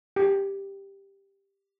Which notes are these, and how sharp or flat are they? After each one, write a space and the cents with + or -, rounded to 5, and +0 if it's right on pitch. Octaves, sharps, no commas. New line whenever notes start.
G4 +5